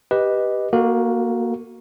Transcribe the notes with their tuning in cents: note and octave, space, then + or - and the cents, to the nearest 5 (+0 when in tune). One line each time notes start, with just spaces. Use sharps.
G4 +0 B4 +0 D#5 +0
A#3 +10 F#4 +0 A4 +40